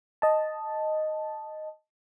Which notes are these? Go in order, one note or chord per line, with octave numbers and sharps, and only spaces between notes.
D#5 A5